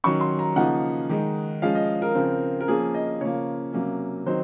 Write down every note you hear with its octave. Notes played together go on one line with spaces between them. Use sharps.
D#3 F#3 C#4 C#6
C6
A#5
C#3 F3 A#3 D#4 F#5
D#3 G#3 D#4
F3 G#3 C#4 F5
D#5
A#4
C#3 F3 C4
A#4
F3 A#3 C#4 G#4
D#5
C#3 F3 A#3 C#5
C3 F#3 A#3 C#4
D#3 F#3 C4 D#4 C5